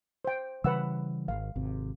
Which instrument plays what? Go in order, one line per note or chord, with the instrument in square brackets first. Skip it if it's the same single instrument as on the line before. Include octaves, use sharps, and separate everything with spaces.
[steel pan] C5 G5
[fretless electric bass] C#3 E3 G3 [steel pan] B4 F#5 E6
[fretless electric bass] G#1 [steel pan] F5
[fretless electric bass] G#1 C3